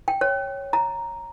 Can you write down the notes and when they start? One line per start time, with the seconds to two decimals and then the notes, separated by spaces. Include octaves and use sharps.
0.08 G5
0.21 C#5
0.73 A#5